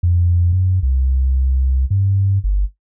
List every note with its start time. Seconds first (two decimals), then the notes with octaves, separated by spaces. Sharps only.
0.03 F2
0.52 F#2
0.83 C2
1.90 G2
2.44 G1